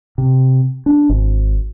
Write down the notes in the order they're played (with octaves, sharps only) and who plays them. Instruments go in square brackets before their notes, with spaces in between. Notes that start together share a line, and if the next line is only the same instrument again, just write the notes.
[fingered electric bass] C3
D4
G#1